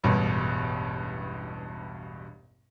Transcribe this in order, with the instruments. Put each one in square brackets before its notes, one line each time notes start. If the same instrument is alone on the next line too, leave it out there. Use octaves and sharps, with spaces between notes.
[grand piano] E1 A1 G2 B2 B4